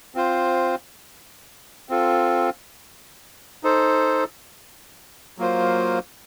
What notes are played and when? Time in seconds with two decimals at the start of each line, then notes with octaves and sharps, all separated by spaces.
0.15 C4 F4 C5
1.89 C4 F4 A4
3.63 D#4 A4 C5
5.38 F#3 A#3 F4 C5